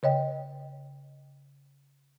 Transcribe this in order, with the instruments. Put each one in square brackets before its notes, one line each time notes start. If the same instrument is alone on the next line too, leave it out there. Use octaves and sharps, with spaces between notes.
[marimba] C#3 C#5 D#5 G5